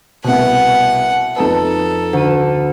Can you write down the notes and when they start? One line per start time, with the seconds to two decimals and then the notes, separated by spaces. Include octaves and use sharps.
0.24 C2 B2 F#5
1.36 F2 D#4 A4 B4
2.13 D2 D#7